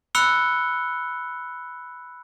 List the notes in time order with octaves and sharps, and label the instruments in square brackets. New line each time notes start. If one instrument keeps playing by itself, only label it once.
[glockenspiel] B5 E6 F#6 C#7 G7